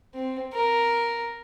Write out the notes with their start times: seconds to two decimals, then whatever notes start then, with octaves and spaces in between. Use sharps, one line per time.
0.14 C4
0.53 A#4